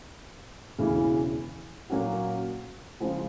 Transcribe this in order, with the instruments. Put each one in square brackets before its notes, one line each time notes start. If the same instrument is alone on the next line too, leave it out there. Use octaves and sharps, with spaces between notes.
[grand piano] E1 E2 C#3 E3
A#2 F#3 A#3 C#4 F#4
C#3 F3 G#3